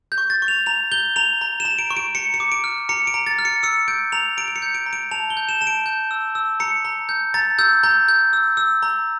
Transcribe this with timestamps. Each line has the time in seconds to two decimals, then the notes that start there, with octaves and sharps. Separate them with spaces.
0.12 G6
0.18 C#6
0.30 A6
0.42 C#6
0.48 F7
0.66 A#5 F7
0.92 G6 G7
1.16 A#5 F7
1.41 A#5
1.60 E7
1.65 A#5
1.79 D7
1.91 C#6
1.97 D7
2.15 A#5 C#7
2.34 C#7
2.40 D6
2.52 D7
2.64 F6
2.89 A#5 C#7
3.07 D7
3.14 A#5
3.26 A6
3.39 F6
3.45 C#7
3.63 E6 C#7
3.88 G6 D7
4.12 A#5 F7
4.37 A#5 D7
4.48 D7
4.56 C#7
4.62 G6
4.75 D7
4.86 A#5
4.93 D7
5.11 A5 F7
5.30 G7
5.37 G6
5.49 E7
5.61 A5 E7
5.67 D7
5.86 G6
6.11 E6
6.35 E6
6.60 A#5 C#7
6.85 A#5
7.09 G6
7.34 A#5 A6
7.59 E6 G6
7.83 A#5 G6
8.08 G6
8.33 E6
8.57 E6
8.82 A#5